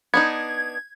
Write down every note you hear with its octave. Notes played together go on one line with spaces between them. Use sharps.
B3 D4 D#4 G#6